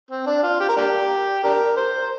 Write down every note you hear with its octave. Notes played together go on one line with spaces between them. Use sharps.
C4
D4
F4
G4
A#4
A#3 D4 G4
D4 G4 A#4
C5